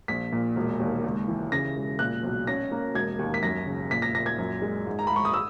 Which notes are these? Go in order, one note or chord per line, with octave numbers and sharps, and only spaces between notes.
A#1 B6
A#2
E1
D#2
C#2
E3
C#3 A#6
E1
A#2 F#6
B1
C#4 A#6
A#3
E1 G#6
D#2
B6
F#2 A#6
C#3
A#2 B6
A#6
A#2 A#6
G#6
F#2
G#3
G#2
A#5
G#2 B5
C#6
D#6
E6